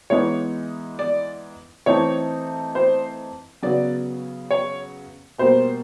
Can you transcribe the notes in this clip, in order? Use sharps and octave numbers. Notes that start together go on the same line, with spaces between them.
E3 G#3 B3 D#4 C#5
D5
E3 A3 C4 D#4 C#5
C5
C#3 F#3 B3 D5
C#5
B2 G3 A#3 C5